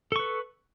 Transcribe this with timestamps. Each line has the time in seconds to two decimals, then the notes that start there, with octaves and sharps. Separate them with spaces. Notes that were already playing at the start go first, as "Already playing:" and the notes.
0.12 A4
0.16 C#6
0.19 B4